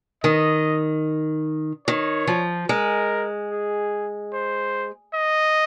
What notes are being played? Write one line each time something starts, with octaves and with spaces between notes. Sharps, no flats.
D#3 D#5
D#3 C#5
F3
G#3 A#4
G#4
C5
D#5